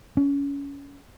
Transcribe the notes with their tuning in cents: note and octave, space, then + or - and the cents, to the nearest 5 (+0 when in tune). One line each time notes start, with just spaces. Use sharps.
C#4 +25